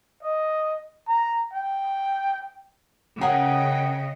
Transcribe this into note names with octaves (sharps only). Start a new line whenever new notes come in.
D#5
A#5
G5
C#3 G#4 A#4 D#5 F#5 G5